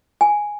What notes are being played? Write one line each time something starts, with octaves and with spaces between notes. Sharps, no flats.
G#5